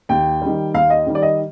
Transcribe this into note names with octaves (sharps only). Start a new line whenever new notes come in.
D#2 G5
D#3 G3
D#2 F5
D#5
D#3 G3
D5
D#5